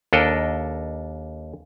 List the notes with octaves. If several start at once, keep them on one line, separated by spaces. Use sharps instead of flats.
D#2 D4 A4 A#4 D#5